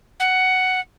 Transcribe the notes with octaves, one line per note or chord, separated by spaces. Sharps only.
F#5